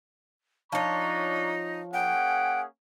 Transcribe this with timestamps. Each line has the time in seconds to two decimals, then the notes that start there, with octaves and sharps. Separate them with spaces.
0.72 F3 D4 D#4 C#5 A#5 C#6
1.93 A#3 C#4 G#4 F#5 G5